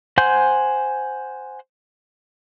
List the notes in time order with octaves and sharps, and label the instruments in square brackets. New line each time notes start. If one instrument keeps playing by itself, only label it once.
[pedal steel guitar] C5 F#5 G#5 C6 G6